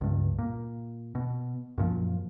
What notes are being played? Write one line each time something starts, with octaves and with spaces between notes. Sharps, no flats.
C#2 G2
A#2
B2
F#2 A#2 F3